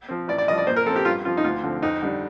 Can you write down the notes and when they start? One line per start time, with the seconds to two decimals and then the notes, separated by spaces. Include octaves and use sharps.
0.08 F3 C4
0.28 A1 D5
0.38 D5
0.48 G2 F3 D#5
0.58 D5
0.67 A#2 C5
0.76 A#4
0.86 F3 A4
0.90 C4
0.96 G4
1.05 G2 F4
1.25 F3 C4 F4
1.37 D#4
1.44 D2 F4
1.63 D3 F3 C4
1.82 F2 D#4
2.02 D3 G3 D4